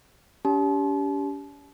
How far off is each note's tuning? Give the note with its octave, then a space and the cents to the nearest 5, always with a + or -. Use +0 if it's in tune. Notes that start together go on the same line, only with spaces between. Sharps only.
C#4 +45 G4 +0 A5 -35